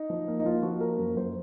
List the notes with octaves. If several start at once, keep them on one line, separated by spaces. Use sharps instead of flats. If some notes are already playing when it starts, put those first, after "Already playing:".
Already playing: D#4
F3
A#3
D#4
F3 F4
F3 F#4
A#3 A#4
F#2
F#2 C5